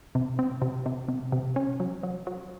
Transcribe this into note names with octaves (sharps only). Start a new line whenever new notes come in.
C3
C4
C3
C3
C3
C3
C#4
F#3
F#3
F#3